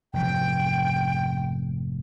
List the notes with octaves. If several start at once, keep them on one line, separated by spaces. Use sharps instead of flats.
F1 G#2 E3 G5